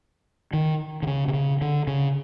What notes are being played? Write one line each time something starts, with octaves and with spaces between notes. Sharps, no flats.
D#3
D3
C#3
C3
C#3
D3
C#3